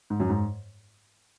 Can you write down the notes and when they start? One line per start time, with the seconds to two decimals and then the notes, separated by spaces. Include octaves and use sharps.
0.10 G#2
0.20 F#2
0.29 G#2